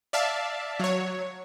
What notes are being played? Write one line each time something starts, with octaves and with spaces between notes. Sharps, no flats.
D5 E5 F5 A5
F#3 C#5